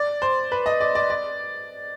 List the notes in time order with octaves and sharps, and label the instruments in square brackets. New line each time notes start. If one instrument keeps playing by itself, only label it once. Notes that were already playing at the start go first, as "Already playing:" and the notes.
Already playing: [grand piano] D5
C5
B4
D#5
D5
D5
D5